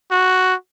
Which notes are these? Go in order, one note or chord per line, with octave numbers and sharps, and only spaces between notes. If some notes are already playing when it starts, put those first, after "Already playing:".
F#4